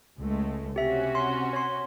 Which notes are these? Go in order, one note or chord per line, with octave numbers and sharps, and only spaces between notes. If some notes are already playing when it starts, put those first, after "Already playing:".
C#2 G#3 A3
C3 C#4 F#4 G4 E5
C6
C#5 C6